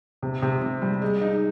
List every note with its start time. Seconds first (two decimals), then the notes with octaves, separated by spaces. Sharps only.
0.23 C3
0.42 C3
0.62 C3
0.82 G3
1.02 G#3
1.21 D#4